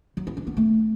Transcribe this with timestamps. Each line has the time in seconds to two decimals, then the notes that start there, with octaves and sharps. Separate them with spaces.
0.17 F#3
0.27 E4
0.37 D4
0.47 B3
0.57 A3